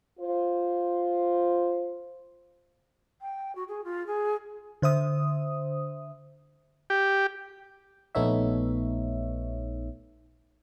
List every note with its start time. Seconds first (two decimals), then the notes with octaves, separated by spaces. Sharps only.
0.20 F4 C5
3.21 G5
3.55 F#4
3.68 G#4
3.84 F4
4.07 G#4
4.82 D3 C5 E5 D#6
6.90 G4
8.15 A#1 A3 B3 D#4 C#5 E5